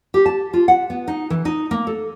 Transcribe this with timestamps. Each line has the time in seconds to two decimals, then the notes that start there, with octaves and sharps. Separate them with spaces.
0.14 G4
0.26 A5
0.53 F4
0.68 F#5
0.90 B3
1.08 D#4
1.30 E3
1.45 D#4
1.71 A#3
1.87 A4